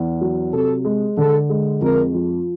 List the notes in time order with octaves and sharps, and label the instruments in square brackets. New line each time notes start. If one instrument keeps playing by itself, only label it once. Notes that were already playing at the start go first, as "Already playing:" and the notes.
Already playing: [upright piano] E2
F#3
[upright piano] C3 [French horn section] A4
[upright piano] G#3
[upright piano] D3 [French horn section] A4
[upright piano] G#3
[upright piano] F2 [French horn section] A#4
[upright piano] F3